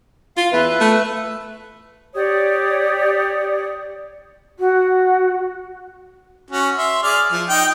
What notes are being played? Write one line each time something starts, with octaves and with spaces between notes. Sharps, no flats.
F4 F5
E2 B4 E5
A3
G4 C#5 D5 D#6
F#4
C#4 F#4
E5 C6
G#4 D5 F6
F3
D#4 G5